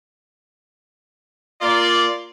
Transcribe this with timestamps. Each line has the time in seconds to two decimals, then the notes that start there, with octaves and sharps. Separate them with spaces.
1.62 A#3 F4 D5